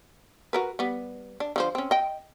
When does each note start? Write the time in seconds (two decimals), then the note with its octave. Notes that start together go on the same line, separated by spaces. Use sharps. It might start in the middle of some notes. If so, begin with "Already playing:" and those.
0.53 F#4 A#4 B4
0.79 G3 B3
1.40 D4
1.56 D3 F3 C5
1.75 C4 C#4
1.91 D#5 G5